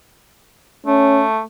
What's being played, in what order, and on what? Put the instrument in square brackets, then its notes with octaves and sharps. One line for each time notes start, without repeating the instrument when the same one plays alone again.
[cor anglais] A3 [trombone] C#4